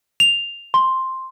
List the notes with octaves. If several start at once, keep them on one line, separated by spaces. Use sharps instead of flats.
F7
C6